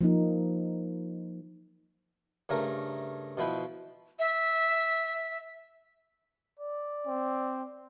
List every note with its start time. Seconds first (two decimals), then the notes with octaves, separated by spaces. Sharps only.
0.01 F3 A#3 D#4
2.49 G2 C#3 A3 A#4
3.37 B2 F3 E4 B4 G5
4.19 E5
6.60 D5
7.07 C4